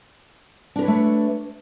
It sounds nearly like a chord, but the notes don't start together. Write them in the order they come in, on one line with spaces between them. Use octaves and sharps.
D4 A#4 B4 C#5 A3